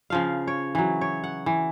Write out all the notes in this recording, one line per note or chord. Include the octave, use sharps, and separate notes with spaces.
C#3 F3 F5
C#5
E3 F#3
C#5
F#5
E3